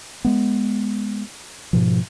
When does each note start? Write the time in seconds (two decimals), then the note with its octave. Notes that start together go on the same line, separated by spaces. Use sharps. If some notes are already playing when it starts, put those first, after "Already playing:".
0.25 G#3 B3
1.73 G#2 B2 F3